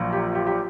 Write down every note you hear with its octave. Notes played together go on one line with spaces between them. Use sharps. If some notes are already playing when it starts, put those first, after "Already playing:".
Already playing: A#1 A#2 F#3
G4
G4
G4